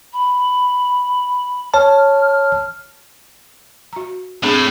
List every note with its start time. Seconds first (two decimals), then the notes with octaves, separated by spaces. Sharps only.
0.13 B5
1.74 C#5 A5 F6
3.93 F#4 A#5
4.43 A2 C4 D4 G#4